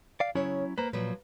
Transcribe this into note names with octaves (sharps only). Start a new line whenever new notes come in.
D5 F5
C#3 F#3 C#4 E4 C#5
A#3 B4 C5 A#5
A#2 F3 F#3 B4